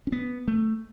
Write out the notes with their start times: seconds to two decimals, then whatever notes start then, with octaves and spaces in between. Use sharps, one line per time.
0.07 C#4
0.12 B3
0.48 A3